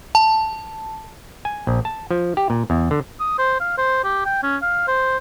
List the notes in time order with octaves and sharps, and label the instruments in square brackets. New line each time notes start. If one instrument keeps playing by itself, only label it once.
[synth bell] A5
[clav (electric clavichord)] G#5
A#1
A5
F3
G4
A#2
E2
D3
[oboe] D#6
C5
F5
C5
G4
G5
C#4
F5
C5